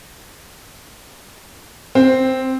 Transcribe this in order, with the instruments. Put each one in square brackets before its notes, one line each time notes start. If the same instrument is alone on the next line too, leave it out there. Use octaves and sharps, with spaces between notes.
[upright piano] C4